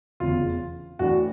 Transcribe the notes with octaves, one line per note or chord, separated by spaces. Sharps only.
F1 E2 C#3 F4
A2 E3 A3 D4 F#4